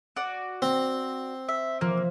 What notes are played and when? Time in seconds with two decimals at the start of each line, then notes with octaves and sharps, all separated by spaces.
0.16 F#4 D5
0.62 C4
1.49 E5
1.81 F3 A#3